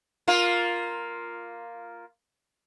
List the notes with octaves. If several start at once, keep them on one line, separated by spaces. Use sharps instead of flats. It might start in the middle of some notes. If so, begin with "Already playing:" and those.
A#3 F4